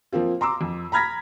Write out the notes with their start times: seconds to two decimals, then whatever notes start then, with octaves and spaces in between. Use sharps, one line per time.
0.12 F3 A#3 C4 F4
0.41 A#5 C6 D6 E6
0.61 F2
0.92 A#5 B5 F6 G#6 A#6 B6